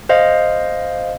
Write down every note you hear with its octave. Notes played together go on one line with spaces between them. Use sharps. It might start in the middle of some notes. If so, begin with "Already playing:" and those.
C5 D#5 F5